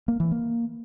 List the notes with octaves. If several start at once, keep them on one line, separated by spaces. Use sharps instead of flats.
A#3
E3
A#3